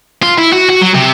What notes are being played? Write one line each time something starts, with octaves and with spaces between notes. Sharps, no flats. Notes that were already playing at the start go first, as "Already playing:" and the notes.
F4
E4
F#4
F#4
F#3
C3